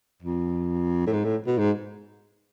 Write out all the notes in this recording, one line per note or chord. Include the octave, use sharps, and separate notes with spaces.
F2
A2
G#2
A2
B2
G#2